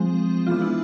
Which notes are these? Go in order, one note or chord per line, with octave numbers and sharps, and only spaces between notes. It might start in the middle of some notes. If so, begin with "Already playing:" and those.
Already playing: F3 G#3 C4
E3 G#3 B3 D4 F4
E4